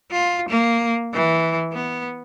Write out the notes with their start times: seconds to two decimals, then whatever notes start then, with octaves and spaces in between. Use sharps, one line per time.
0.12 F4
0.49 A#3
1.14 E3
1.72 B3